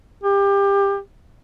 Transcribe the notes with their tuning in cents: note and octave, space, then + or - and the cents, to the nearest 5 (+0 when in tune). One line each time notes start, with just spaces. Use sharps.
G4 +25